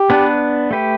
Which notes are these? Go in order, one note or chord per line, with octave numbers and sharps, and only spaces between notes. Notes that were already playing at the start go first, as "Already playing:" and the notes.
Already playing: G4
B3 D4 B4
A3 G4 B4